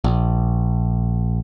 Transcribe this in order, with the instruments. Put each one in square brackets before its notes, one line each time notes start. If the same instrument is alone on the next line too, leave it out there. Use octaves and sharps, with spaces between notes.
[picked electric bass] A#1